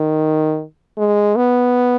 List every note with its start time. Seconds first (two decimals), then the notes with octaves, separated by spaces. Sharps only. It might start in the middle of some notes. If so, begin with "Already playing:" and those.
Already playing: D#3
0.98 G#3
1.36 B3